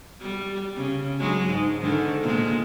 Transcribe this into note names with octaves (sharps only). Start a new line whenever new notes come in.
G3
C#3
F#3 G#3 D4
G#2
G#2 D3 D#3
A#2 G#3